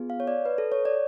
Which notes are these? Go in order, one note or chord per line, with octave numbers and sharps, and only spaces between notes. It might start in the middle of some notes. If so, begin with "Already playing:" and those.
Already playing: B3 F4 G#4
F5
C#5
D5
B4
A4
C#5
D5